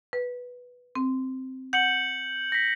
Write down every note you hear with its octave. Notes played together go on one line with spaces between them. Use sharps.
B4
C4
F#5 G6 C#7 F#7
A#6 B6